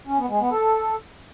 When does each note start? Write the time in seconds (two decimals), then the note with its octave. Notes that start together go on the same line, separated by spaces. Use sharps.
0.07 C#4
0.18 B3
0.29 G#3
0.40 B3
0.51 A4